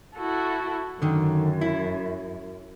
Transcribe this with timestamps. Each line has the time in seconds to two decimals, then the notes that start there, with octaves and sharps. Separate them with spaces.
0.15 E4 F#4 A4
1.02 F#2 D3 D#3
1.61 E4